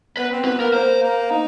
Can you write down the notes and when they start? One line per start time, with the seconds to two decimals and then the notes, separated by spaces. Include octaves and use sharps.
0.17 B3 B4
0.31 C4
0.45 B3 B4
0.59 A#3 A#4
0.73 A#3 C5
1.02 A#3
1.31 D#4